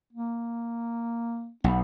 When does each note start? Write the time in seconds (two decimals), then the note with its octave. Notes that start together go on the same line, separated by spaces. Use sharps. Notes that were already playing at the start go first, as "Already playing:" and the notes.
0.13 A#3
1.64 B1 B3